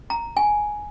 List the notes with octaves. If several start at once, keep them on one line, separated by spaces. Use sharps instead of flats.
A#5
G#5